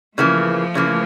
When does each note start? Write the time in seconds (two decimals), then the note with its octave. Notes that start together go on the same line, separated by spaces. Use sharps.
0.18 C#3 E3 F3 A3 A#3
0.75 C#3 E3 A#3